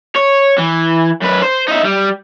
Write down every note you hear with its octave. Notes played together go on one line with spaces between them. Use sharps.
C#5
E3
F#2 B4
C5
D#4 E5
G3